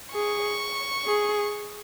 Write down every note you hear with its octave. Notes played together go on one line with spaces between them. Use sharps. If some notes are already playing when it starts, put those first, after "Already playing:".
G#4 C#6
G#4